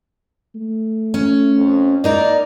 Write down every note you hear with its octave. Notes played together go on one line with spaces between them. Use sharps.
A3
C#4
F2
A#3 D#4 A#4 D5